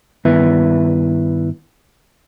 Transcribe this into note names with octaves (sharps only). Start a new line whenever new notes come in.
G2 D#3 B3 E4 B4 E5